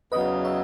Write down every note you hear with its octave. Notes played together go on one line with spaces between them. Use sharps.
E2 C#3 F#3 B4 D#5
C#5 E5